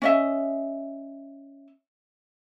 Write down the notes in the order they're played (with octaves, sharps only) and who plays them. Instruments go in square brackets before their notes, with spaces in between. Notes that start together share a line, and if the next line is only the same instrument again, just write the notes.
[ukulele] C#4 D#5 E5